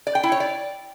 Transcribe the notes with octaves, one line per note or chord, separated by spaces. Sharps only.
D5
G5
E4
C#5
D5